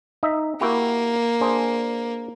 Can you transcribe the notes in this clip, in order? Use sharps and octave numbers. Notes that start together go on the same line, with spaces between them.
D#4 D#5 E5
A#3 E4 F#4 G4
D4 G#4 C5